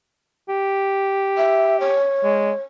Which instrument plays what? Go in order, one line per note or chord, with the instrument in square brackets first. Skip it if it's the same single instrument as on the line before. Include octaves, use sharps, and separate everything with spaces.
[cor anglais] G4
[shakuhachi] E5
C#5
[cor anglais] G#3